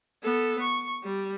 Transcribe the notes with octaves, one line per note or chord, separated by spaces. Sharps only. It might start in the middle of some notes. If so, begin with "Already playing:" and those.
B3 A4
C#6
G3